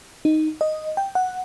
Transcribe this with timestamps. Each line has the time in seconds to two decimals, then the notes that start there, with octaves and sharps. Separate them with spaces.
0.25 D#4
0.61 D#5
0.97 G5
1.15 F#5